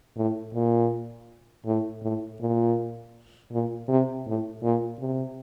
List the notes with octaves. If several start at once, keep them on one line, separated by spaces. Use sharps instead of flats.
A2
A#2
A2
A2
A#2
A#2
C3
A2
A#2
C3